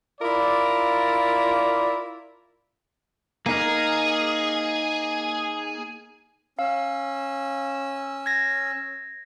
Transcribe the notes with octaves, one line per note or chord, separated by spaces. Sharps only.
E4 F4 A#4 D5
A#3 D#4 G#4 A#4
C#4 F5 E6
G#6 A#6